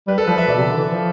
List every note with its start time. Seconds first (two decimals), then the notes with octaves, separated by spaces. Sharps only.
0.08 G3 B4
0.18 A4
0.27 F3 B4
0.38 E5
0.47 B2 D5
0.58 C3
0.68 D3
0.77 E3
0.88 F3